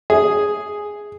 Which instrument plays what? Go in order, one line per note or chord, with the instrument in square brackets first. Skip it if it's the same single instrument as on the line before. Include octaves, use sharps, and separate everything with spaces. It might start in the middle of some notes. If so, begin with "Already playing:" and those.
[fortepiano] G#4